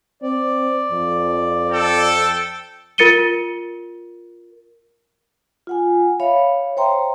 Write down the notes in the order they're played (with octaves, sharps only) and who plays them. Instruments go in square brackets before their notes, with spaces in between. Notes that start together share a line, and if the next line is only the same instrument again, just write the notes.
[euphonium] C4 [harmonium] D5
[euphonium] F2
[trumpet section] A4 G5
[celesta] F4 A#4 A6 C#7 D#7 G7
[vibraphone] F4 F#5 G#5
C#5 E5 F5 B5
C5 C#5 E5 G5 A#5 C6